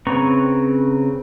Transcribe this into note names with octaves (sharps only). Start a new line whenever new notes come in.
C#3 C4 B4 A#5 C#6